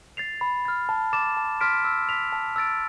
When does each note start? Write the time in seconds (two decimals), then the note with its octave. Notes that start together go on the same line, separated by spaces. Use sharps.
0.17 A6 C7 F7
0.41 B5
0.65 F6 A6
0.89 A5
1.13 D6 A6 E7
1.37 A5
1.61 C6 F6 B6 D7
1.85 E6
2.09 B6 F7
2.32 A5
2.56 E6 A6 D7